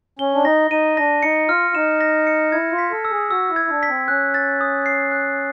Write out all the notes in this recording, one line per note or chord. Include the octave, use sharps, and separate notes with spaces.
C#4 G7
D4
D#4 A#6
D#4 D#7
D4 A#6
D#4 C#7
F4 F6
D#4 E7
A#6
C#7
E4 G#6
F4
B6
A4
E6
G#4
F#4 E6
E4
G#6
D4
B6
C4
C#4 F#6
A6
D#6
C7
F#6